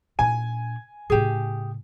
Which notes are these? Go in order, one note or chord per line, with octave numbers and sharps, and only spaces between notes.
A#2 D4 G#5
A2 C#3 G4 G#4